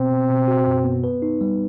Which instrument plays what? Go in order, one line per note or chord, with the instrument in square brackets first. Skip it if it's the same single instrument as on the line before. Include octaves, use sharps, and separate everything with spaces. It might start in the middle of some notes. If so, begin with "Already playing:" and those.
Already playing: [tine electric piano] B2 B3 [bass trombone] C4
[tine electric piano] B2
B2
F#4
F#2
B3
B4
D#4
G3